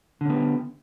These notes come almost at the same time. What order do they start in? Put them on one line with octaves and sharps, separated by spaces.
D3 C#4 B3